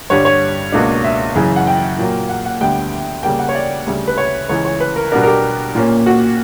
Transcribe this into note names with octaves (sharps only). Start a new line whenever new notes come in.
G2 D3 G3 C#5
C#5
C#2 B2 A#3 D4
E5
F#2 C#3 E3
F#5
G5
A#2 F#3 A#3
F#5
F#5
D2 D3 G3 B3 G5
C#3 G3 A#3 G5
F#5
C#5
D5
D2 C#3 G3
B4
C#5
C#2 C#3 E3 C#5
C#5
B4
A#4
B2 G3 B3 D4 A#4
A#4
G4
A#2 A#3 C#4
F#4